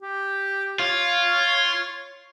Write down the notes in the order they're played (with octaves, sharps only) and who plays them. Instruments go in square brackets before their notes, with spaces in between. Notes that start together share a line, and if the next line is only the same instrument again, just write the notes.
[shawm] G4
[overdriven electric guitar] F4 [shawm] C#5